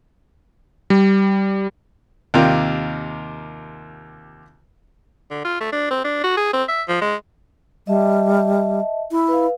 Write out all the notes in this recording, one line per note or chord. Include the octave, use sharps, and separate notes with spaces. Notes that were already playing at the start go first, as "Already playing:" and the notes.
G3
D#2 C3 F4 A#4 G5
D3
F4
A3
D4
C4
D4
F#4
G#4
C4
E5
F3
G#3
G3 D#5 E5 A5
E4
B4 F5